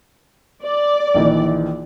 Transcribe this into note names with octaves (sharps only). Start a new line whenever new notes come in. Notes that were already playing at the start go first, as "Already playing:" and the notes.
D5
A#1 D#3 E3